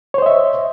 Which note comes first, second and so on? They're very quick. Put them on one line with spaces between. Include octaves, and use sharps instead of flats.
C#5 C5 D#5 E5